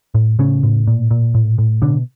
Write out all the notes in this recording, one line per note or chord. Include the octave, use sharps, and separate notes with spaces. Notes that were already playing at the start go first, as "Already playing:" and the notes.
A2
A2 C#3 C#4
A2
A#2
A#2
A2
A2
B2 D3 D4